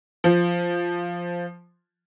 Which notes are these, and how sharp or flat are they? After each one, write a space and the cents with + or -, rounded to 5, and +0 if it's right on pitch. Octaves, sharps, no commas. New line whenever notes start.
F3 -5